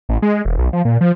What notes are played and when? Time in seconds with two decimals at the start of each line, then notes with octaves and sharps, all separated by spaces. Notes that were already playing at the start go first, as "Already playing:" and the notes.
0.09 A1
0.22 G#3
0.45 E1
0.58 B1
0.73 F3
0.85 A#2
1.01 F3